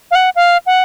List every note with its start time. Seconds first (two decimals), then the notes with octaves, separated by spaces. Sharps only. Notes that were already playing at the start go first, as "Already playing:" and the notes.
0.11 F5
0.15 F#5
0.36 F5
0.66 F#5